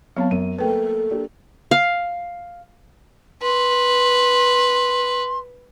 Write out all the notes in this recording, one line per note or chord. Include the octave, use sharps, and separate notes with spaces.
F#3 B3 C4 C#5 F5 A5
F#2 D#7
A3 A#3 A4 B4 G5
A#3 D4 G4
F5
B4 C6